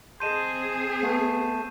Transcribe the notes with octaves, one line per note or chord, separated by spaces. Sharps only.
C4 G#4 D#5 A5 C6 G6 D#7 E7
A3 B3 B4